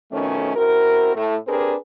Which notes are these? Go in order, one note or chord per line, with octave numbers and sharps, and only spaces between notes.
F2 B2 D#3 A3 C#4
C4 E4 F#4 A#4
A2 A3
C4 D4 G4 G#4 A#4 B4